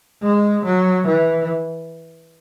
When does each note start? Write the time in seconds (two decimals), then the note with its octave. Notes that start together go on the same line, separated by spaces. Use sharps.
0.22 G#3
0.65 F#3
1.07 E3